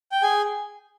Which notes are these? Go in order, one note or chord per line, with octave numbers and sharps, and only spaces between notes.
G5
G#4 G#5